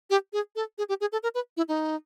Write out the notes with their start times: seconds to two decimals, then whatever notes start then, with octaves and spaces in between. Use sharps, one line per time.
0.10 G4
0.33 G#4
0.56 A4
0.78 G#4
0.89 G4
1.01 G#4
1.12 A4
1.23 A#4
1.34 B4
1.57 E4
1.68 D#4